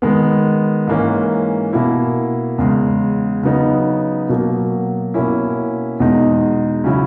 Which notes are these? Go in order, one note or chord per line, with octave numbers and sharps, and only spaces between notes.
D#3 G#3 B3
G#2 E3 A#3 C#4
B2 A#3 E4
E2 C#3 G#3
C#3 F#3 B3 D#4
B2 F#3 A#3
B2 A#3 C#4 E4
E2 B2 G#3 D#4
C#3 F#3 C#4 E4